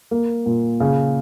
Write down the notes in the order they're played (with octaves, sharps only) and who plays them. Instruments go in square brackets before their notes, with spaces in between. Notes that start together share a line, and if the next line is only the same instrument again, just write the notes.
[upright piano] A#3
A#2
C#3